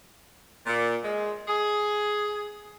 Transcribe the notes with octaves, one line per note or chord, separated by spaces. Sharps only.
A#2
G#3
G#4